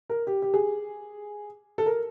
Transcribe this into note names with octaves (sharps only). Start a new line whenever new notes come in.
A#4
G4
G4
G#4
A4
A#4